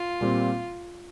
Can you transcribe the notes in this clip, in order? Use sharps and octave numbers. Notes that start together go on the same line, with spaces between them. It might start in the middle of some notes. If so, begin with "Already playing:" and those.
Already playing: F4
A#2 G3 C4